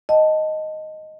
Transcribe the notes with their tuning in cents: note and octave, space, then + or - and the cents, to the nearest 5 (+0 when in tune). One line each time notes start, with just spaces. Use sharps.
D#5 +0 F#5 +5 A5 +0